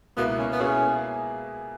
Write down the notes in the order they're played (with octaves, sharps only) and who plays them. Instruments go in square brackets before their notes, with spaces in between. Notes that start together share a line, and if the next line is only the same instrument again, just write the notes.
[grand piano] C#2 B2 A#3 E4 [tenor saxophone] B3
[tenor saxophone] C#4
B3
[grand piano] B2 A#3 E4 G#4 [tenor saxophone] C#4